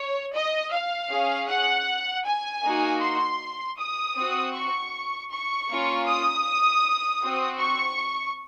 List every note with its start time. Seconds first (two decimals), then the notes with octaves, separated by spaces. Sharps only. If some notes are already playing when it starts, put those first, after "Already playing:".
Already playing: C#5
0.34 D#5
0.73 F5
1.10 C#4 G#4
1.49 F#5
2.26 G#5
2.63 A#3 D#4 F#4
3.01 C6
3.78 D#6
4.16 C4 F#4
4.55 C#6
5.32 C#6
5.69 A#3 C#4 F4
6.07 D#6
7.22 C4 F#4
7.60 C#6